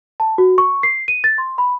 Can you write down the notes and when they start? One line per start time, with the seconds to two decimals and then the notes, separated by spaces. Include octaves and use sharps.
0.20 A5
0.38 F#4
0.58 C#6
0.83 C7
1.08 D#7
1.24 A6
1.38 C6
1.58 B5